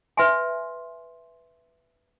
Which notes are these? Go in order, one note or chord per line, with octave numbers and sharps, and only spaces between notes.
B4 E5 G#5 C6